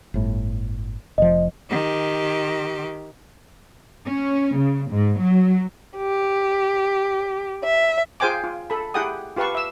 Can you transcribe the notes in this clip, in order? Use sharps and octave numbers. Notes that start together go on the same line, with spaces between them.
G1 A2
F1 F3 D#5
D#3 G4
C#4
C#3
G#2
F#3
G4
E5
F4 G#4 C5 G5 G#5 D6
F4
A4 B5
E4 G4 G#4 F#5 G5 D#6
F4 G4 B4 F5 A5 C#6
E5 E6